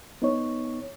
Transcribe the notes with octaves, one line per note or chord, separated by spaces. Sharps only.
B3 D#4 C#5